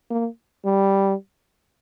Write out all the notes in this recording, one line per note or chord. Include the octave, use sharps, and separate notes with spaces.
A#3
G3